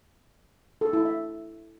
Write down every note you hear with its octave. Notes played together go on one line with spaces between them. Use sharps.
A4
E4
E5